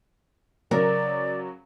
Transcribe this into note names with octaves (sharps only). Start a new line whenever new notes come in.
C#3 F#3 A#4 D5